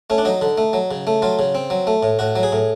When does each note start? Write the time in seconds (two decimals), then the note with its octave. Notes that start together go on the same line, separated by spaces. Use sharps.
0.10 A3 C#4
0.18 D4
0.25 F#3 D#4
0.41 D3
0.58 A3
0.73 F#3
0.91 C#3
1.07 A3
1.22 F#3 F4
1.39 C#3
1.55 C4
1.70 F#3
1.87 A3
2.03 A2
2.19 A2 F#4
2.36 F#3
2.43 G#4
2.52 A2